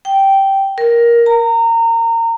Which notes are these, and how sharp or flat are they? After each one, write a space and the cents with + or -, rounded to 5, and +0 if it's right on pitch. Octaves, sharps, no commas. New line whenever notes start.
G5 -10
A#4 +10
A#5 -25